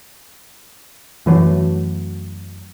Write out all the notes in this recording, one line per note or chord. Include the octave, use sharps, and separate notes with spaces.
F#2 E3 F#3 A3